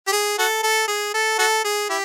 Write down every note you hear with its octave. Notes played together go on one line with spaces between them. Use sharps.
G4
G#4
F#4 A4
A4
G#4
A4
F#4 A4
G#4
E4 G4